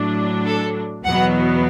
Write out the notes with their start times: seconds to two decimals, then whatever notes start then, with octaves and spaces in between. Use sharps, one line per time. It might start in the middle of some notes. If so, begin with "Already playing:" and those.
Already playing: A2 F#3 D4
0.46 A4
1.04 E2 B2 F#3 B3 F#5